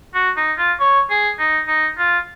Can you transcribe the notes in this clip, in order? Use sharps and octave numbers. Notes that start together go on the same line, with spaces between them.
F#4
D#4
F4
C#5
G#4
D#4
D#4
F4